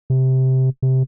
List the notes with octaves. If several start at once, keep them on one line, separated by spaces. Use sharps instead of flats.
C3
C3